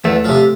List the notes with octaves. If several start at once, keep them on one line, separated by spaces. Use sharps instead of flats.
E2 A3
C3 F3